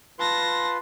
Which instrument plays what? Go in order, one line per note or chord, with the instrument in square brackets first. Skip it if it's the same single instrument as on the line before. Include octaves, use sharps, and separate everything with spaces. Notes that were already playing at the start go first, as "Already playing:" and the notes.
[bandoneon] F4 B4 C6 [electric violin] A5 A#6